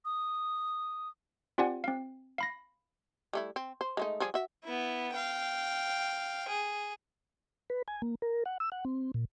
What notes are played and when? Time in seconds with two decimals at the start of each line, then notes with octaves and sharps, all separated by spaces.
0.05 D#6
1.58 C4 F4 G4 D5 F#5 G#5
1.84 C4 F5
2.38 F5 B5 A#6
3.33 G3 A3 E4
3.56 C4
3.81 C5
3.97 G#3 A3 D#4
4.20 F3 G3 G#4
4.34 F#4 E5
4.64 B3 E4
5.12 F5 G5
6.48 G#4
7.70 B4
7.88 G#5
8.02 A#3
8.22 A#4
8.46 F#5
8.60 E6
8.72 F#5
8.85 C4
9.14 A#2